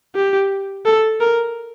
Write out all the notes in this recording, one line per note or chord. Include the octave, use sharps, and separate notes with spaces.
G4
A4
A#4